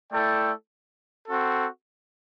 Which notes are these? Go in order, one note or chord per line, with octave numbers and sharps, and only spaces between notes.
A3 E4 A4 D5 G5
C4 F#4 A4